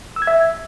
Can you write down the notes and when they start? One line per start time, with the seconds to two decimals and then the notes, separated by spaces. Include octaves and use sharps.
0.16 E6
0.22 G#6
0.27 E5